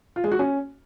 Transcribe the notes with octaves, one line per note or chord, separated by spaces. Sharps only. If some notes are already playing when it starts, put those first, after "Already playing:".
F4
G#3
F#4
C#4